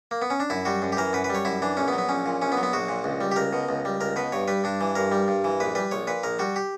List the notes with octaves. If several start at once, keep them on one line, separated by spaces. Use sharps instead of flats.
A#3
B3
C#4
D4
F#2 E4
G3 F#4
F#2
G4
E3 A#4
F#2 B4
B4
G3
C#5
F#2 E4
E3 D4
A#1 C#4
B3
F#3
B3
A#1 C#4
A#2
A#1 C#4
B3
F#3
B3
A#1 F#4
A#2
C#2
G3
G4
C#2 A#4
B2
C#2
G3
C#2 A#4
B2 B4
G2 C#5
G3 B4
G2 D4
E3
G2 A#4
G3
G2
E3
A#1 B4
G3 B4
A#1 C#5
A#2 B4
A#1 A#4
G3 F#4
G4